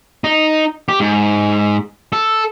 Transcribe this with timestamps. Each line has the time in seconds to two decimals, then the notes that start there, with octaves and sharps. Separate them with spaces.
0.24 D#4
0.88 G4
1.00 G#2
2.12 A4